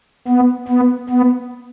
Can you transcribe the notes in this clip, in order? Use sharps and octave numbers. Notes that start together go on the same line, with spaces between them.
B3
B3
B3